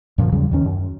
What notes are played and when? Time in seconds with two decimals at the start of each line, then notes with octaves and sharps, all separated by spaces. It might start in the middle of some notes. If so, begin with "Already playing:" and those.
0.18 F#2 A#2 D3 F3
0.32 E2 C#3 F#3 G3
0.52 D#2 D#3 C#4
0.65 F#2